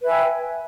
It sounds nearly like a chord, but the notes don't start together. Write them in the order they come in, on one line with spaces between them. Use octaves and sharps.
B4 E5 G#5 G5